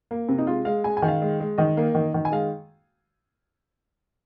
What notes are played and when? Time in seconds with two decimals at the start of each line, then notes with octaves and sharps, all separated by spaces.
0.11 A#3
0.29 C3
0.38 D#4
0.47 G#3 F4
0.65 G#3 F5
0.84 G#3 G#5
0.97 G#5
1.02 D#3
1.08 F5
1.22 G#3
1.40 G#3
1.58 D#3 D#5
1.77 A#3
1.95 D#3
2.14 D#3
2.25 G#5
2.32 G#3 F5